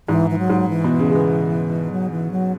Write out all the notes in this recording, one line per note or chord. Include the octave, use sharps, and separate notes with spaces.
G#2 E3
E3
F#3
G#2
E3
B2
C#3
G#3
B3
F#3
E3
F#3